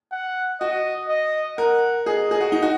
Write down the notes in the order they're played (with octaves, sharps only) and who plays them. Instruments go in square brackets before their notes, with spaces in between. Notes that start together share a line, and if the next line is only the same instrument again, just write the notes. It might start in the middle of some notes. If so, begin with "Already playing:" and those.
[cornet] F#5
[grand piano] F#4 [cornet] D#5
[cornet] D#5
[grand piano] A#4 [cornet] F#5
[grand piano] G#4 [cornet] D#5
[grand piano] G#4
F#4
D#4
F#4